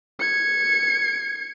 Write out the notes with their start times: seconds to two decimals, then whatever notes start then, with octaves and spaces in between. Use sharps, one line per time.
0.20 G#6 C#7